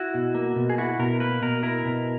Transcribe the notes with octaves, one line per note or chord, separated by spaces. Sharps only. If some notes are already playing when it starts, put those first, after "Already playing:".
Already playing: E4 F#4
B2
A#3
B2
G#4
E4 F#4
B2 A#4
A#3 B4
B2 A#4
E4 A#4
B2